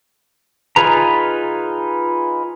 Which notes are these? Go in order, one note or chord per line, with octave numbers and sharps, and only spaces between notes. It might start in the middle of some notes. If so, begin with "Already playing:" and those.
D#4 F4 G#4 B4 A#5